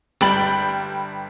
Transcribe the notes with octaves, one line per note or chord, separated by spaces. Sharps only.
G1 G3 G5 B5 A6 F#7